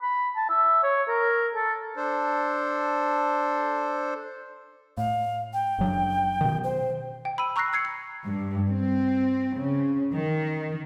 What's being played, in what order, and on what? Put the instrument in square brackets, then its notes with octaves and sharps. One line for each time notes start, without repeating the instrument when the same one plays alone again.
[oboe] B5
A5
E5
C#5
A#4
A4
[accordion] D4 A4 C5
[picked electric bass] A2 [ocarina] F5
[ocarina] G5
[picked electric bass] F#1 F#3 D4
B2 D#3
[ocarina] C5
[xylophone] G5
B5 E6 D#7
A#5 C#6 E6 F#6 A#6 C7
E6 G#6 C7 C#7
C7
[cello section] G2
C4
C#3
D#3